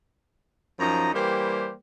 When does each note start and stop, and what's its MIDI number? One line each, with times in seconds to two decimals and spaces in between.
0.79 1.11 42
0.79 1.11 53
0.79 1.11 63
0.79 1.11 82
1.14 1.72 52
1.14 1.72 55
1.14 1.72 58
1.14 1.72 67
1.14 1.72 72